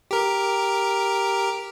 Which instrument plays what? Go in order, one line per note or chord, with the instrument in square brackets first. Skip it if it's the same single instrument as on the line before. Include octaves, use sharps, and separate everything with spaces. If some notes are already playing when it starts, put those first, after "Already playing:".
[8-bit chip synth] G4 A#4